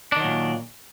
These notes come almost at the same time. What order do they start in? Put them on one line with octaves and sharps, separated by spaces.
D4 D#3 F#3 A#2